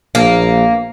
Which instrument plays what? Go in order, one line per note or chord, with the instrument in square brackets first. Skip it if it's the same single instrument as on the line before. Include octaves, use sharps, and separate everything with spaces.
[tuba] A#1 [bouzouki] A#3